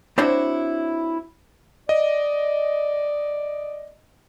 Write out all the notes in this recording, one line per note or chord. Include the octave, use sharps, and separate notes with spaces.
C4 D4 E4 F#4 C5 C#5
D5 D#5